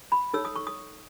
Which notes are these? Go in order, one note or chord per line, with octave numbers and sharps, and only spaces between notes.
B5
D#4 A4 C#5 E6
D#6
C#6
D#6